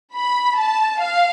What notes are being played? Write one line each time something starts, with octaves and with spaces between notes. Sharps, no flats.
B5
A5
F5